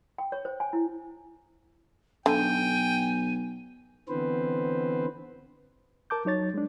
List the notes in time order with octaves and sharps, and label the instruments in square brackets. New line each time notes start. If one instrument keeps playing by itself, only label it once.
[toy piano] G5
C#5
C5
G#5
E4
[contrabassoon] B1 [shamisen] D3 [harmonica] G5 [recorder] G#5
[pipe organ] D3 E3 B3 C4 B4 C5
[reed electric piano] A#4 A5 D6 G6
F#3 D#4 C#5 A6
G#3 D4